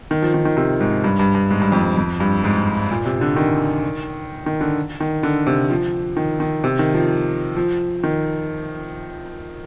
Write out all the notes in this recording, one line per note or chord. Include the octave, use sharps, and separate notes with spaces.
D#3
F3
D#3
D#3
C3
G#2
G2
G2
G2
G#2
G2
F2
G2
F2
G2
G#2
A#2
C3
D3
D#3
D#3
D3
D#3
D3
C3
F3
D#3
D#3
C3
D#3
F3
F3
D#3